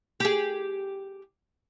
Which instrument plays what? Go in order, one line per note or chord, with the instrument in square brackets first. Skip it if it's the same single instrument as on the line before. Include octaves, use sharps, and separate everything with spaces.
[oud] G4 G#4